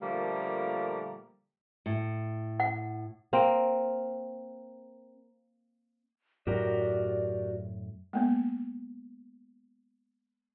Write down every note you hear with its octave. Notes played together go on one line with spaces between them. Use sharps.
A#2 D3 F3 G3 A3 A#3
A2
F#5
A#3 C4
F#2 A2 F#3 F#4 G4 A#4 D5
G#3 A#3 B3